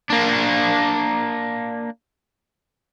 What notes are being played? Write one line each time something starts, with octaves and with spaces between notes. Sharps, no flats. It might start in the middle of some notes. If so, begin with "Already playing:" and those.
A#3 D4